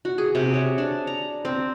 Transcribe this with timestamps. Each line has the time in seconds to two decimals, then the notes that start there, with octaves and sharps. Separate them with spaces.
0.05 F#4
0.18 G#4
0.35 C3
0.54 C#5
0.78 D4
1.07 A#5
1.45 C4